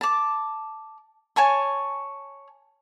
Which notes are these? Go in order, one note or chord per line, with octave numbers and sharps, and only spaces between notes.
A5 D6
C#5 G#5 A5 C#6